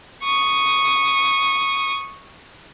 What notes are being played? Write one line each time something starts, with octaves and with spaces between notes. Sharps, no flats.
C#6 D#6